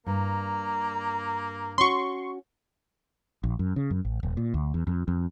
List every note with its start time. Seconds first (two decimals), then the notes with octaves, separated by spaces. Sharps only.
0.07 G2 A#3 A#5
1.78 C#4 F#4 C6 C#6
3.44 A#1
3.59 F#2
3.76 C#3
3.90 F#2
4.05 A1
4.23 D#1
4.37 A#2
4.54 D2
4.74 E2
4.87 F2
5.08 F2